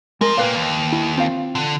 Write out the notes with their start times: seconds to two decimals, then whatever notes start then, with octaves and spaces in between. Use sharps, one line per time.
0.21 F3 G#3 F4 A#4
0.37 A#2 A#3 B4 C#5 F5 G5
0.55 D#2
0.92 E4
1.18 C4 F4 F5
1.55 D3